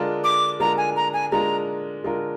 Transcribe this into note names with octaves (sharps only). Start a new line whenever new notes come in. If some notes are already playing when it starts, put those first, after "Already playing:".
Already playing: D3 G#3 D4 F4 A#4
D6
D3 G#3 D4 F4 A#4 A#5
G#5
A#5
G#5
D3 G#3 D4 F4 A#4 A#5
D3 G#3 D4 F4 A#4